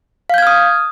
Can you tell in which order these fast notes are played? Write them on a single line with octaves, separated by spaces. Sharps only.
F5 G6 G#6 F6 D#6